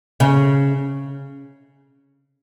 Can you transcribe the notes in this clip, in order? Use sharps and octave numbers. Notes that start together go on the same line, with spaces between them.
C#3